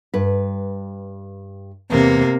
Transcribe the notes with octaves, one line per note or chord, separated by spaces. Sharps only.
G2 B4
E2 C3 A#3